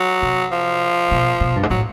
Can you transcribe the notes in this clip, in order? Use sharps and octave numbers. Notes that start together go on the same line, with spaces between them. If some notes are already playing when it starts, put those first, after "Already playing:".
Already playing: F#3
C3
F3
B2
B2
G2
G#2
A2 F#3